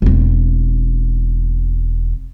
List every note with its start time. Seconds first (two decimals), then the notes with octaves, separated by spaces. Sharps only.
0.02 E1 C4